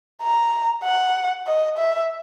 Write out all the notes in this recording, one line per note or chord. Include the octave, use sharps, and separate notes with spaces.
A#5
F#5
D#5
E5